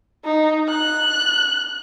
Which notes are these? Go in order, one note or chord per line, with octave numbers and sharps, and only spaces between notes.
D#4
F#6